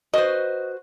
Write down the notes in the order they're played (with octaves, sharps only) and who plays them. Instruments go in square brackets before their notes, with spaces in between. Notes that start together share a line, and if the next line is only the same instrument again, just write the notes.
[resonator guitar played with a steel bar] F#4 B4 C5 [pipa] D#5